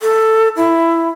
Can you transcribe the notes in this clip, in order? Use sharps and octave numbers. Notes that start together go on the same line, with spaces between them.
A4
E4